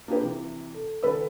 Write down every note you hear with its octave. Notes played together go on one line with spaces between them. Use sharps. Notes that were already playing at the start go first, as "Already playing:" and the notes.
A#3 D4 F4 G4 G#4 B4
C3 E3
A4
C#2 D#3 A4 B4 B5 E6